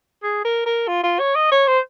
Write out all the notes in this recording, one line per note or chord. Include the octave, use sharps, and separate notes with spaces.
G#4
A#4
A#4
F4
F4
C#5
D#5
C#5
C5